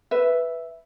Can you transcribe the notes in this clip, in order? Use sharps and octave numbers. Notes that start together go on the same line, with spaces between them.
B4 E5